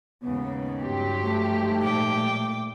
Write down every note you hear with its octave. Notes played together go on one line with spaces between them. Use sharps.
D#2 G#2 C#3 B3
G2 F#3 G4 C6
G#2 F3 G3 A3
A#2 G5 D6